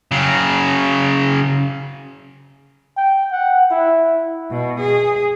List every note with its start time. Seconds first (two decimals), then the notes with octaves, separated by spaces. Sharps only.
0.11 C#3 F#3
2.97 G5
3.32 F#5
3.71 E4
4.51 B2
4.80 G#4